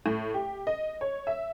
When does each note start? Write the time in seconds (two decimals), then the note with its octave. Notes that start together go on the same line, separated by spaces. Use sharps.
0.06 A2
0.34 G4
0.67 D#5
1.01 C#5
1.27 E5